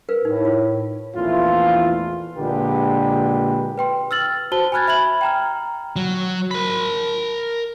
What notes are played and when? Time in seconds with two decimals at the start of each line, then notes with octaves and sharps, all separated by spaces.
0.09 A#4 B4 F5
0.25 A2 D#4
0.45 F4
1.16 A#1 E2 E3 A3 F4
2.37 A#1 A#2 D3 G#3 G4 B4
3.78 B4 G5 C6
4.11 E6 F6 A6 F#7
4.52 F#4 C5 A5 G7
4.72 G#5 B5 F6 F#6 G#6 A6
4.88 E5 B5 G#6 F#7
5.21 G5 A#5 F6
5.96 F#3
6.51 A#4 B5